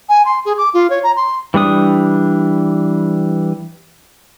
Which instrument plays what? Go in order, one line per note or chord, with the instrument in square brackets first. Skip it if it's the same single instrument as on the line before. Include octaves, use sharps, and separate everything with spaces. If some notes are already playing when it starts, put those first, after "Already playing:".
[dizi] G#5
C6
G#4
D6
F4
C#5
A#5
C6
[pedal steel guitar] E3 G3 D4 D#6